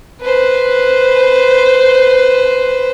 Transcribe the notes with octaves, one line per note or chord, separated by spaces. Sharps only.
B4 C5